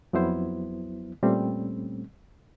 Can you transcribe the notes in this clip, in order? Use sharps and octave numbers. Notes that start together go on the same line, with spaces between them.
F2 F#3 B3 E4 C5
A#2 G3 A3 C4 C#4